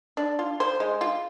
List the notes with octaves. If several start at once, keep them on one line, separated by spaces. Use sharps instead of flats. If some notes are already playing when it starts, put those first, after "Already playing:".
D4
F4
C5
G#3
F4